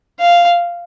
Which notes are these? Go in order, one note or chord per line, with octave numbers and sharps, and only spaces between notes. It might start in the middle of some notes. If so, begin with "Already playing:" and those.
F5